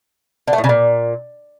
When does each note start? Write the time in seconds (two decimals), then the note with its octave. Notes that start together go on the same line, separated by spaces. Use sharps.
0.48 D3
0.53 A3
0.58 A2
0.64 C#3
0.69 A#2